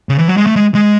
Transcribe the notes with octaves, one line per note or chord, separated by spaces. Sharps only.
C#3
E3
F#3
G#3
A3
G#3
G#3